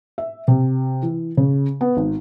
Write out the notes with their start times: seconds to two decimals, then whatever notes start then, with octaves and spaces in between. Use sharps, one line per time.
0.18 E5
0.48 C3
1.03 E3
1.37 C#3
1.81 B3
1.97 G#1